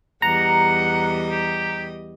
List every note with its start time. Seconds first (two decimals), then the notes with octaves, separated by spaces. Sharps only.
0.22 E2 G3 D#5 F#5 A#5
1.31 G4